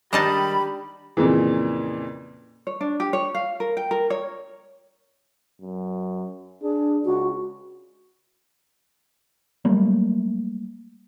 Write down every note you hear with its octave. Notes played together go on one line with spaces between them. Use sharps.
D#3 G3 G#3 D4 D#4 G4 A5 B5
F2 A#2 C#3 E3
C#5
D4
G4
C#5
F5
A#4
G5
A#4
C#5
F#2
D4 G#4
C#2 F#4
F#3 G3 A3 A#3